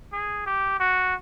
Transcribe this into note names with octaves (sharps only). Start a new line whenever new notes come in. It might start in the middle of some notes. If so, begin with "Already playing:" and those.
G#4
G4
F#4